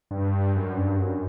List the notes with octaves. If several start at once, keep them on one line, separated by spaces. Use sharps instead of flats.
G2
F#2
G2
F#2